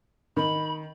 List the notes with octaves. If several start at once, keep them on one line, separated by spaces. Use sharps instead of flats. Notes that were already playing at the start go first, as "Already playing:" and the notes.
D#3 B5